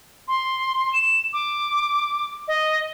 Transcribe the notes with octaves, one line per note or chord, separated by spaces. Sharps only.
C6
E7
D6
D#5